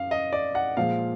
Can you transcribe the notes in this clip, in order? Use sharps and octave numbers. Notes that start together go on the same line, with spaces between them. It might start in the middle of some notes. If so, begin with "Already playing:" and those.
Already playing: F#2 F5
D#5
D5
F#5
A#2 F3 G#3 F5